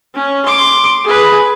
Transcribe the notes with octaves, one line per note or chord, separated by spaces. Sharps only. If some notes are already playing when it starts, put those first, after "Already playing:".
C#4
C6 D6
G#4 B4